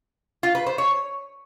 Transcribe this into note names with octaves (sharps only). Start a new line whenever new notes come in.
F4
B4
C5
C#5